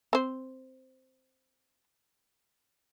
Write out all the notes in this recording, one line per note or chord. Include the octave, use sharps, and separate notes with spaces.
C4 C5